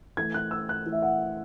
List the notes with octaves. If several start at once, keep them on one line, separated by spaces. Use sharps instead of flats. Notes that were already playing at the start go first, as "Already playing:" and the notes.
E3 A3 E4 G#6
F#6
E6
F#6
E3 A3 E4
E5
F#5